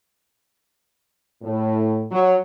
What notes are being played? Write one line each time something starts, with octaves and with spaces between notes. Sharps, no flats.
A2
F#3